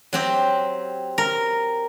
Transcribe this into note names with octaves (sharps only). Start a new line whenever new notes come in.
F#3 C4 G4
A#4